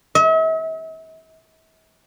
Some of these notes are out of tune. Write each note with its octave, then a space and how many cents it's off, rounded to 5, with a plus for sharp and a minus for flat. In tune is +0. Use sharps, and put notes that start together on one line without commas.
E5 -45